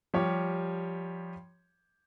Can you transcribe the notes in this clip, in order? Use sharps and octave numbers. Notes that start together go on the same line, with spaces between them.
F3 G3 G4 C#5